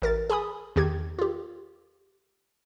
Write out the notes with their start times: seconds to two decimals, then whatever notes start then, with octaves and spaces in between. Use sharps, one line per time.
0.02 A1 A#4 A6
0.30 G#4 G#5 B5 D#6
0.76 E2 D#3 G4 G#6
1.19 F4 G4